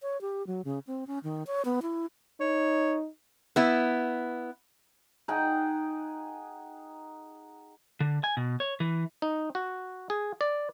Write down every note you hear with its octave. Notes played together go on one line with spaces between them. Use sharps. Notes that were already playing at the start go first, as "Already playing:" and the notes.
C#5
G4
F#3
C#3
C4
C#4
D#3
C#5
B3
E4
D#4 C#5
B3 E4
D#4 G#4 F#5 G5
D3
G#5
B2
C#5
E3
D#4
F#4
G#4
D5